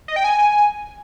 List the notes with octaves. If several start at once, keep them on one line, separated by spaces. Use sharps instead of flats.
D#5
G5
G#5